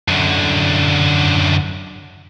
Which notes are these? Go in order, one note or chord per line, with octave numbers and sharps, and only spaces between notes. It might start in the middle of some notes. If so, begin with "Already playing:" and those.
F#2 D3